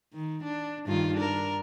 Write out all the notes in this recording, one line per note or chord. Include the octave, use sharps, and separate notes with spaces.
D#3
D4
G2 D#3 F4
D4 A#4